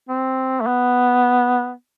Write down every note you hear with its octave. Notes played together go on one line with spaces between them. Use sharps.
C4
A3
B3